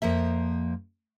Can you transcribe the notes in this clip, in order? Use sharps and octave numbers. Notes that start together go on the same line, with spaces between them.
F2 F3 A#3 E5